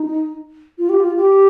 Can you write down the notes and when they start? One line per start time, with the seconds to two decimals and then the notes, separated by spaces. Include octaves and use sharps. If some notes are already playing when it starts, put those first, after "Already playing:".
Already playing: D#4
0.78 F4
0.89 G4
1.00 F4
1.17 G4